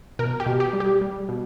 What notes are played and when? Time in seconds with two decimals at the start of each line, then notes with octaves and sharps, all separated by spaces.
0.19 B2 A#4
0.40 G4
0.46 B2
0.60 G4
0.73 G3
0.80 G4
1.01 G3
1.29 B2